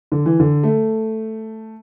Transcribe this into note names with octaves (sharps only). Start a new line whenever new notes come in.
D3
E3
D3
A3